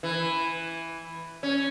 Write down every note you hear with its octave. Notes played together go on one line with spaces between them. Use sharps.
E3
C#4